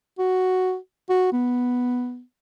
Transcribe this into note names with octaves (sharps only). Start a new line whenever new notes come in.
F#4
F#4
B3